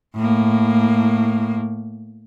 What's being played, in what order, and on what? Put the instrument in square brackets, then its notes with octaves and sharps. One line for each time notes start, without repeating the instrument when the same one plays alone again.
[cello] A2 A#3